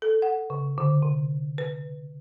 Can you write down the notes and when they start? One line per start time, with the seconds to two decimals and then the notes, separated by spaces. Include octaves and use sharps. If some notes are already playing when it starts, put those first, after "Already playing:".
0.02 A4
0.22 F#5
0.50 C#3
0.78 D3
1.02 C3
1.58 B4